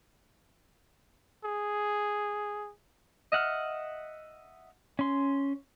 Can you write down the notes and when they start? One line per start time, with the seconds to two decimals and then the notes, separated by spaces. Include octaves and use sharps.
1.44 G#4
3.32 D#5 E5 F#5 F6
4.99 C#4 C6